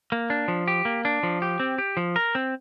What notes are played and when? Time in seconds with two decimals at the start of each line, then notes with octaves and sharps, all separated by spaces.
0.12 A#3
0.30 D4
0.48 F3
0.68 G4
0.85 A#3
1.05 D4
1.23 F3
1.42 G4
1.60 C4
1.78 G4
1.97 F3
2.16 A#4
2.35 C4